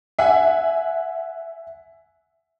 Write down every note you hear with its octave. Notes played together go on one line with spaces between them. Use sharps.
E5 F#5 G#5